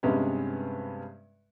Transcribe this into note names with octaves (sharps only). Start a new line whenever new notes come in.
G2 C3 G#3 B3 C#4